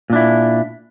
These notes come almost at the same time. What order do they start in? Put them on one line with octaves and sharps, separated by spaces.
A#2 D4 E4